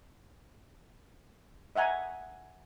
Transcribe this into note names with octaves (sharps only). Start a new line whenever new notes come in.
D#5 E5 F#5 G#5 A#5